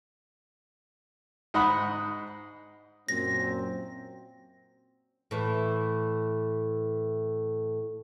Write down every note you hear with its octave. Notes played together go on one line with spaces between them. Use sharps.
G#2 D#5 F#5 B5
F#2 A#2 C4 A#6
A2 E3